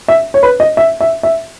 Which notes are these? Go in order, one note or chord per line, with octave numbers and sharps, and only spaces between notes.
E5
C#5
B4
D#5
E5
E5
E5